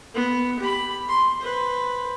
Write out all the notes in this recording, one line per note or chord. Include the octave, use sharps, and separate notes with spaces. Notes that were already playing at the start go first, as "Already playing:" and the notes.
B3
G4 B5
C6
B4 C5